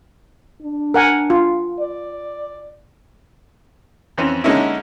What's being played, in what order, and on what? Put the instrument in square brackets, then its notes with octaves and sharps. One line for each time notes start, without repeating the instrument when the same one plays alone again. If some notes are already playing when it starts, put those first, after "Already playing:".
[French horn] D4
[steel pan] A#4 F#5 G#5
F4
[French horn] D5
[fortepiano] F2 E3 C4 C#4
D3 G#3 A#3 C#4 D#4 E4